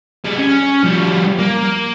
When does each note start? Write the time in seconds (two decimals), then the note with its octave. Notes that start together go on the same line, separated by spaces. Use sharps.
0.25 G3 G#4
0.38 C#4
0.84 F3 G3
1.39 A#3